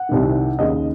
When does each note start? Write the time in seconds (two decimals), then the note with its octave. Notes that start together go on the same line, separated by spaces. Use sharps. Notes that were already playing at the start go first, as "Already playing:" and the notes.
Already playing: F#5
0.09 C2 C3 D#3
0.59 D#2 C#3 D#5